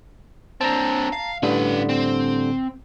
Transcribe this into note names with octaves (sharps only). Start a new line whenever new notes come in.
C4 D4 A5 A#5
F5
A2 D3 G3 C#4 B4
C4